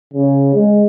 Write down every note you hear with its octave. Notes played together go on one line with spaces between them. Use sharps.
C#3
G#3